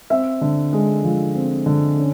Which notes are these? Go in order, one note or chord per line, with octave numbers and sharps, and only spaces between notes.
C4 E5
D3
G#3
F3
C4
D3
C#4